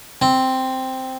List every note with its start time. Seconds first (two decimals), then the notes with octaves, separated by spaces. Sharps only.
0.22 C4